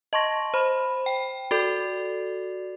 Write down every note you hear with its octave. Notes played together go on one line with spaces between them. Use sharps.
D#5 A5 C6 C#6 A#6
C5 B5
G5
F#4 A4 D5